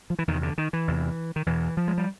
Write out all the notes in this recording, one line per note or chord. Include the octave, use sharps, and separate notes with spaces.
F3
E3
E2 C3 D#3
D3
D#3
E3
E2 C3
D#3
E2 B2 E3
F3
G#3
G3